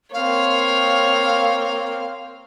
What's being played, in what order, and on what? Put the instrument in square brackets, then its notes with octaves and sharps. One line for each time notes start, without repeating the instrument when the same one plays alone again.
[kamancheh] A#3 C4 [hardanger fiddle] C#5 [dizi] F5